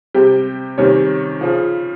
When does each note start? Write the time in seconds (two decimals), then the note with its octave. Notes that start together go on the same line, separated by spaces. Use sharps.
0.14 C3 G3 G4 G5
0.78 C3 D#3 G3 C#4 C#5
1.41 C#3 F3